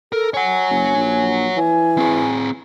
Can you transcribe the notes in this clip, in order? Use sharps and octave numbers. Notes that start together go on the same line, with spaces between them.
A4 A#4
C#5 F#5 G#5
F#1
A#1
E3 G#5
C4 G#4